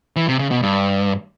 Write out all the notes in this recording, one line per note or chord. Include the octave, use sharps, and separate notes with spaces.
E3
C3
C#3
B2
G2